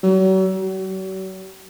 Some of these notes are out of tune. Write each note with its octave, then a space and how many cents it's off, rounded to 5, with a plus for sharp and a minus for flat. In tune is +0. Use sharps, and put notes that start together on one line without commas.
F#3 +40
F#3 +40